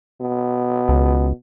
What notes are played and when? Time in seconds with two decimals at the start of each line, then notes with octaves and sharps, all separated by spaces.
0.21 B2
0.89 C#2